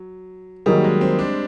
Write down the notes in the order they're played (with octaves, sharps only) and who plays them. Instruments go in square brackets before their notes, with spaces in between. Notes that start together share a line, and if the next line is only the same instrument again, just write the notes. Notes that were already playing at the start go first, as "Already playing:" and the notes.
Already playing: [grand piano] F#3
[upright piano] D#3 F#3 A#3 D#4 G#4 [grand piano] G3
[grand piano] G#3
C4
D4